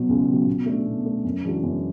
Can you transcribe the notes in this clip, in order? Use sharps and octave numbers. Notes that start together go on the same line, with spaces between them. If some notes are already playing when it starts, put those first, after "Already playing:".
Already playing: B2 F#3
C#2
B2 F#3
B2
A3 D4
B2
A3 D4
F#2
E3 G#3 D4 F#4
F#2